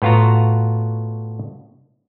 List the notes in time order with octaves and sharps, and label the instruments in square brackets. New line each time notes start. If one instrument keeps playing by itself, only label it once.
[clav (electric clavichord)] A2 B3 F4 F#4 A#5